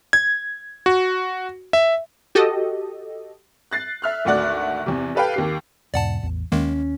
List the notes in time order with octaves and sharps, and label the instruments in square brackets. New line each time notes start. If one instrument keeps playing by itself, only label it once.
[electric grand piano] G#6
F#4
E5
[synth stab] F#4 G4 A4 D#5
[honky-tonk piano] F#6 A6 C7
E5 F6 F#6
G#1 D2 A3 F#4 D5 F#6
E2 C3
G4 A4 B4 F5 G5
D#2 G4 C7
[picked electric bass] E2 G#2 B2 [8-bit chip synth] D5 F#5 A5
[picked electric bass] A1 E2
[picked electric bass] D#2 [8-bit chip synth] D#3 G#3 A#3 [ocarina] C#4